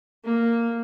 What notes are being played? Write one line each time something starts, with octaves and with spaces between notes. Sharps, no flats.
A#3